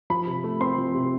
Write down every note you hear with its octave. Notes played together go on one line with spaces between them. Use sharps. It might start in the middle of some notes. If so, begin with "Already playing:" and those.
F3 B5
C3
A3
C4 C6
F3
C3